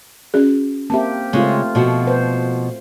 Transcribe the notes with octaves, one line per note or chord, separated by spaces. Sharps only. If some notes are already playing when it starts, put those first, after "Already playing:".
C#4 F#4 G#4
A#3 C4 G4 E5 A5
C#3 G#3 A3 C4 F4
B2 F3 F#4
B4 C5